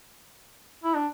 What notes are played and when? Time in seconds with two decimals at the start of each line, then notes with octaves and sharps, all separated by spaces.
0.84 E4
0.95 D4